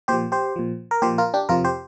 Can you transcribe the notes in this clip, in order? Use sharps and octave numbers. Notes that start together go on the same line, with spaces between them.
A#2 F3 G4 C5
G4 C5
A#2 F3
A#4
A#2 F3 G4 C5
F4 A#4
D4 G4
F2 C3 F3 F4 A#4
G4 C5